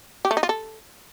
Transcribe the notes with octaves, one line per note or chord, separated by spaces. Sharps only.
G4
A3
D#4
F4
A4